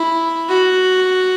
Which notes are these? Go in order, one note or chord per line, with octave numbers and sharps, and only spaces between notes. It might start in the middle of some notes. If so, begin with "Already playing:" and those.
Already playing: E4
F#4